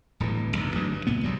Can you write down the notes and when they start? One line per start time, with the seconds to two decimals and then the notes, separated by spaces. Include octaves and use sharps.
0.20 D1 G1 A2 E3
0.57 F#1 B1 G2
0.74 G1 D2 E3 F#3
0.93 G2
1.07 C#2 A#2 B3
1.23 A#1 C3 F#3 G3